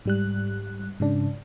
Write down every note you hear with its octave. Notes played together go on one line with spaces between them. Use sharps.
G#2 G3 F#6
G#2 C#3 D4